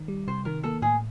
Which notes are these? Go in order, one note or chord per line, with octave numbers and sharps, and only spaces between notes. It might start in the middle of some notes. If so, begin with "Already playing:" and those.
Already playing: D#3
G3
C3 C5
D#3 A#4
A#3 A4
A2 G#4